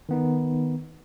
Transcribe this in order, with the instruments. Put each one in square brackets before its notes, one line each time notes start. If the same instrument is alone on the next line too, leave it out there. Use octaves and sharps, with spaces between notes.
[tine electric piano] D#3 B3 D#4